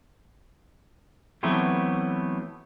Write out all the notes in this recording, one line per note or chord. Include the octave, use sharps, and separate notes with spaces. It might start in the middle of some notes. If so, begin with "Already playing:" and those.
E3 F#3 A3 B3 C4